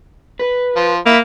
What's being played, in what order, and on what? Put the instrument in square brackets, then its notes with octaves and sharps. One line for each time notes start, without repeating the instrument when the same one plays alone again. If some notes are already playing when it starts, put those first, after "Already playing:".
[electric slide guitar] B4
[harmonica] F3 F4
[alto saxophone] A#3 [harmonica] E5 B5